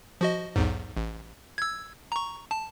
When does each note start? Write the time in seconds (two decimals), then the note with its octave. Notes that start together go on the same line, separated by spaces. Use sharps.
0.21 F3 F#4 D#5
0.56 B1 E2 G#2
0.97 A1
1.58 E6 G#6
2.12 A#5 C#6
2.51 A5